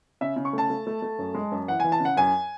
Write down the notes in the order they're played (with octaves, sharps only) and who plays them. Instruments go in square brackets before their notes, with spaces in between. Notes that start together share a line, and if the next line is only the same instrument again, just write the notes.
[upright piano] C#3 E5
C#3
C#6
A3 A5
A3
A3
A3
F#2
G#3
F#2
E3 F#5
E3 G#5
A5
C#3
F#5
F#2 G#5